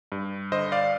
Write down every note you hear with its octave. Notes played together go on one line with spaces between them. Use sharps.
G2
D3 C5 D#5
D5 F5